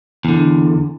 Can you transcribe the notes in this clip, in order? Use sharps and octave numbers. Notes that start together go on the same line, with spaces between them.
E2 D3